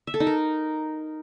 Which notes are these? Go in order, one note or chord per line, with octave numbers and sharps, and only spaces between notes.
E5
A4
D#4
A#4